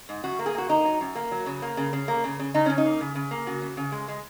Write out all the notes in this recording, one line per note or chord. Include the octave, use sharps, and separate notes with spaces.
G#2
F#2 F#4
A#3
G#4
A#3 F#4
A#3 D#4
F#3
F#2
A#3
F#3
C#3
A#3
C#3
C#3
A#3
C#3
C#3
C#3 D#4
C#3 C#4
D#4
A#3
C#3
C#3
A#3
C#3 F#4
C#3
C#3
G#3
G#3